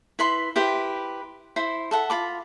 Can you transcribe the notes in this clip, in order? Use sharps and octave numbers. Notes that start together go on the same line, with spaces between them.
E4 B4 B5 C6
E4 G4 B4 C5
E4 C5 C6
A4 E5 F#5
F4 B5 D6